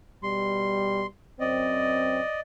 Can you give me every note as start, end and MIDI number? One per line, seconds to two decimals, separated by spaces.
0.23 1.04 47
0.23 1.04 55
0.23 1.06 84
1.40 2.20 42
1.40 2.20 60
1.40 2.40 74
1.40 2.40 75